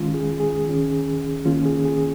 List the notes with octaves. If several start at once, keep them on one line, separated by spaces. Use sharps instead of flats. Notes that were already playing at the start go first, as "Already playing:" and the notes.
Already playing: D#3 G#3 C#4 F4
G#4
G#4
D#3 C#4
D#3 A#3 C#4 F4
G#4
G#4